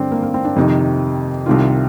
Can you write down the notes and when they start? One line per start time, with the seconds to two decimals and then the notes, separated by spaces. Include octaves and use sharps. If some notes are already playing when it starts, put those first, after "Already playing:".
Already playing: G2 D3 C4 D4
0.12 A#3
0.23 A#3
0.34 C4
0.45 D4
0.56 F2 C3 D#3 D#4
1.46 C2 C3 D#3 F4